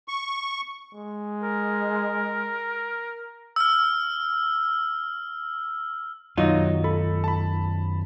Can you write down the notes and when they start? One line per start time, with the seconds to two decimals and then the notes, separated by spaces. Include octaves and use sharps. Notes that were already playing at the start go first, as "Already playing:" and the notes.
0.08 C#6
0.94 G#3
1.43 A#4
3.56 E6 F6
6.37 F#2 D#3 F#3 D#4 F4
6.84 A4 B5
7.24 A5 B5